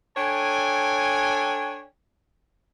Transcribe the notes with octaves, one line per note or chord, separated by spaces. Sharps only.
D4 A4 C#5 G5 G#5